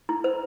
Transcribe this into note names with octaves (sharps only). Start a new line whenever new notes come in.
E4
C5